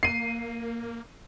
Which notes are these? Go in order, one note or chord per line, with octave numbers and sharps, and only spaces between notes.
A#3 C7 D#7